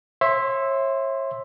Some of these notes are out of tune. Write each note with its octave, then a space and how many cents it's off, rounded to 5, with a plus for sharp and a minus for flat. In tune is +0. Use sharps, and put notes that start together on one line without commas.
C#5 -35 E5 +0 C6 +0